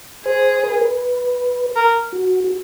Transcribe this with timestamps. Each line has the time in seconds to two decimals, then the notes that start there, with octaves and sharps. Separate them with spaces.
0.26 G#4 C5
0.64 B4
0.72 A#4
0.82 B4
1.75 A#4
2.13 F#4
2.44 F#4